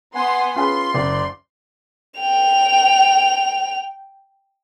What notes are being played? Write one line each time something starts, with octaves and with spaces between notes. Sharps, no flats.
B3 F#5 G#5 C6
C#4 F4 G#4 B4 C6
F#1 D5
G5 F7